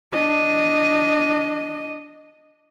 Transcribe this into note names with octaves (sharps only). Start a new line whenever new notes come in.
D4 D#5